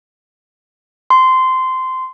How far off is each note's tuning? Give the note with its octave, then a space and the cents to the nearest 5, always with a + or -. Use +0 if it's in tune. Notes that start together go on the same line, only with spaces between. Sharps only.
C6 -15